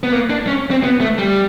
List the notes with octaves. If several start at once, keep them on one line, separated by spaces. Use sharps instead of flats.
B3
A#3
D4
C#4
C4
B3
A3
G3